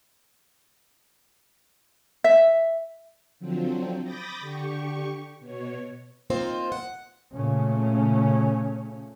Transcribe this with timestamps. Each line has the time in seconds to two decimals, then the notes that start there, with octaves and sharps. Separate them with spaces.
2.24 E5
3.39 D3 F3 F#3 C4
4.02 B5 D6 D#6 G6 A6 A#6
4.40 D3 G4 C#6
5.40 B2 C#5
6.30 A#3 C4 D#4 F4 C5
6.72 F#5
7.33 A#2 C#3 A3 C#4